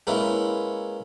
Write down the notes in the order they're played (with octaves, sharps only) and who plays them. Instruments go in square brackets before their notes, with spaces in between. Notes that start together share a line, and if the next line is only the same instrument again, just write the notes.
[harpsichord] G#3 A#3 B3 C#4 E4